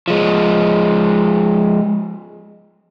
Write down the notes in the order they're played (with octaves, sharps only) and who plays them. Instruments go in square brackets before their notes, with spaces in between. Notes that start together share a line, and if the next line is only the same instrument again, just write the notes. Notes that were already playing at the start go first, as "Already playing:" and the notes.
[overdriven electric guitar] F3 G#3